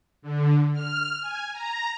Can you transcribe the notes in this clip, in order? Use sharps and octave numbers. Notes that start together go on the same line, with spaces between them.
D3
F6
G#5
A#5